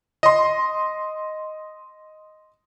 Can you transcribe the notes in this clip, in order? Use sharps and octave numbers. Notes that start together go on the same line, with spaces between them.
D#5 C6